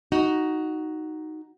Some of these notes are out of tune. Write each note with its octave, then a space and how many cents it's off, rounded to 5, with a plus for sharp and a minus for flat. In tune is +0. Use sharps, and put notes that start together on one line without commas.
D#4 +0 F#4 +5